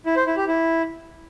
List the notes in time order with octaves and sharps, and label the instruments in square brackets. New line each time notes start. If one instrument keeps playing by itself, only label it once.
[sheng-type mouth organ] E4
C5
E4
G4
E4